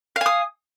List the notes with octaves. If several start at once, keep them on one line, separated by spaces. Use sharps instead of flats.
F5 G#5 D#6